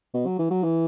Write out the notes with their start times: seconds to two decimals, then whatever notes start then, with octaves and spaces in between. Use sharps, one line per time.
0.14 B2
0.26 F#3
0.39 E3
0.51 F#3
0.63 E3